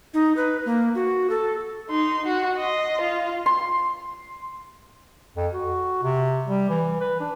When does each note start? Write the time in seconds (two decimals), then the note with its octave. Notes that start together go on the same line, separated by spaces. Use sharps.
0.14 D#4
0.37 B4
0.65 A#3
0.95 F#4
1.30 A4
1.90 D#4 C6
2.25 F#4
2.57 D#5 C6
3.01 F4
3.46 C6
5.37 F2
5.53 F#4
6.03 C3
6.47 G3
6.70 E3
7.01 B4
7.20 D4